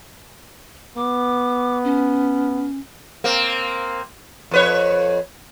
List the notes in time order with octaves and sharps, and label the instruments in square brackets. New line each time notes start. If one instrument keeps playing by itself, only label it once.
[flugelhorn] B3 [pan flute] D6
[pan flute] C#4
[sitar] A#3 C4
F2 B4 C#5